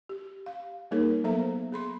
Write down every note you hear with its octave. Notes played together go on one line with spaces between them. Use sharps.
G4
F5
G3 A#3 D#4 G#4 A#4 C#5
F#3 B3 A4 C5 E5 A#5
G#4 B5 C6